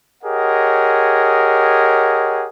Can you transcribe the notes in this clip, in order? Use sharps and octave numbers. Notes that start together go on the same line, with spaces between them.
G4 G#4 A#4 C#5 D#5 F#5